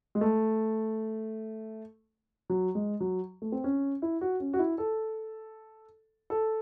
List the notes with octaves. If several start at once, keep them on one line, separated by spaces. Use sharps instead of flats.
G#3
A3
F#3
G#3
F#3
A3
C4
C#4
E4
F#4
C#4
F#4
E4
A4
A4